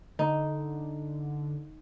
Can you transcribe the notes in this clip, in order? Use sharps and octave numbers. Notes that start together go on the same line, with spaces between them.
D3 D#4